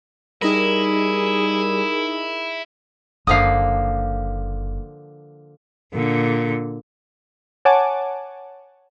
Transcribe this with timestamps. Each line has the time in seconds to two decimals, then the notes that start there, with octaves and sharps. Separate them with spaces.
0.42 G3 D#4 E4 G#4 A#4
3.27 F#1 D3 F3 A#3 F5 D#6
5.93 A#2 D3
7.65 C#5 F#5 G#5 A5 D6